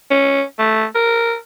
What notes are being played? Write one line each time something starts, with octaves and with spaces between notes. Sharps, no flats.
C#4
A3
A#4